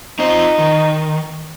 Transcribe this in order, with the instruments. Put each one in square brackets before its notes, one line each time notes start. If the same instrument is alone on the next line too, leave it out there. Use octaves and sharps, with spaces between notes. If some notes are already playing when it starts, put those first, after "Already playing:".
[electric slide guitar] C4 F4 C5 [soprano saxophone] D#4
[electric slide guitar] D#3